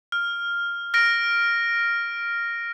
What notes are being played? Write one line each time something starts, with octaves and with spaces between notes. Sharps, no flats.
F6
F6 A#6 D7